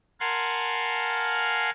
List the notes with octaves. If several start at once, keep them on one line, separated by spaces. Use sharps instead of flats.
A#4 F5 F#5 G#5 A5 C6